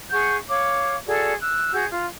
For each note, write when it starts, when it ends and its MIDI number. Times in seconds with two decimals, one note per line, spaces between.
0.10 0.35 68
0.10 0.35 78
0.10 0.35 85
0.10 0.35 91
0.48 0.96 73
0.48 0.96 77
0.48 0.96 86
1.06 1.32 66
1.06 1.32 68
1.06 1.32 69
1.06 1.32 74
1.39 1.70 88
1.39 1.70 90
1.71 1.84 66
1.71 1.84 68
1.71 1.84 91
1.91 2.07 65